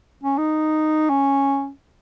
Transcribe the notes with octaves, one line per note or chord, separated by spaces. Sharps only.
C#4
D#4
C#4